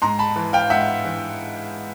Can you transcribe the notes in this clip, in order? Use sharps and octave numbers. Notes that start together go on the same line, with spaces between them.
G#2 A#5 C6
A5 B5
E3
F5 G5
G#2 E5 F#5
E3